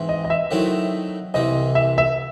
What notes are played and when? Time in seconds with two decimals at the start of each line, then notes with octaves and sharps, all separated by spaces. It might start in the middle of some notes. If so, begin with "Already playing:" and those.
Already playing: G#2 E3 C4
0.09 D#5
0.24 D#5
0.30 E5
0.51 D#3 F#3 A3 C4 E4
1.34 C2 C3 E3 C4 D#5
1.75 E5
1.98 E5